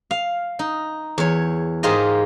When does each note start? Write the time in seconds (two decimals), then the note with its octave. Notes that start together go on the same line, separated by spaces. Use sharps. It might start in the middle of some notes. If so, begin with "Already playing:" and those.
0.11 F5
0.59 D#4
1.18 E2 C#5
1.83 G#2 G#3 F4 G4 A#4 D#5